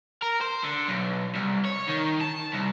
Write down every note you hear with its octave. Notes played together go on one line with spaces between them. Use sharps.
A#4
C5
D3
B1
C2
C#5
D#3
A5
C2